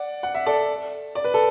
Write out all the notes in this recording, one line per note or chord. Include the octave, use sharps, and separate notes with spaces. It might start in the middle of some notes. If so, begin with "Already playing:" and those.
Already playing: D5 F#5
F#5
E5
A4 D5
D5
B4
A4